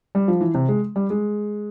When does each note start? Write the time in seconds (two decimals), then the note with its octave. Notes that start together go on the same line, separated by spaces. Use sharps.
0.15 G3
0.28 F3
0.41 E3
0.55 C3
0.69 G#3
0.96 G3
1.10 G#3